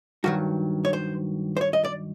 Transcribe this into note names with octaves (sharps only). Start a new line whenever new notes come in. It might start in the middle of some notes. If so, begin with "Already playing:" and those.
G2 D#3 F#3 F#4
C#5
C5
C5
C#5
D#5
D5